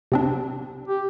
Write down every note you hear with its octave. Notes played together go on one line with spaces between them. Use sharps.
C3 C4 D4
G4